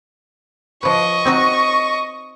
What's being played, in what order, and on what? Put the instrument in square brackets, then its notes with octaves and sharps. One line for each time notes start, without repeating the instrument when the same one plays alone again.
[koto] F3 B4 [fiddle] D#5 C#6
[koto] C4 D#4 F#4